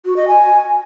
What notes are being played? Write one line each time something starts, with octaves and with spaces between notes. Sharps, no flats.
F#4
D#5
G#5